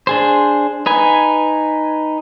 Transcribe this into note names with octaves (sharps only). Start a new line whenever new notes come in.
D4 G#4 C5
D#4 B4 G#5